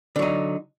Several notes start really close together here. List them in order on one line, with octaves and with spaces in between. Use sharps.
D3 F#3 D#4